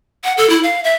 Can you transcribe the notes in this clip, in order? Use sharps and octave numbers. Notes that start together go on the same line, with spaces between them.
F#5
A4
E4
F5
E5